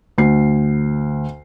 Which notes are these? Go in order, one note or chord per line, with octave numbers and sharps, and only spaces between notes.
D2 C7